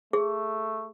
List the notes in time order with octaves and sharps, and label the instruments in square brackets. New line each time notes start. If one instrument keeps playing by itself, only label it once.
[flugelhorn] A3 [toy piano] G#4